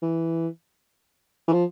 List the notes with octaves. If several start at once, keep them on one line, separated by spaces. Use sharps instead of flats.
E3
E3
F3